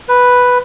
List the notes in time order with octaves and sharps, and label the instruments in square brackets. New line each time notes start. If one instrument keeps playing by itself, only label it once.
[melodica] B4